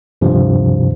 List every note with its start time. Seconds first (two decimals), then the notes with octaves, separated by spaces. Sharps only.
0.21 D2 G2 C3 E3 F3